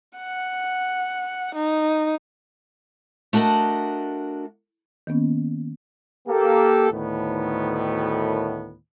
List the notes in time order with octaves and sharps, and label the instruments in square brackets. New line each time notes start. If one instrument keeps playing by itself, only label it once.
[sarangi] F#5
D#4
[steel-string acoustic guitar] A3 D4 F#4 A#4 D#5
[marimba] D#3 A#3 B3 C#4
[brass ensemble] A#3 G4 A4
D2 A2 D#3 B3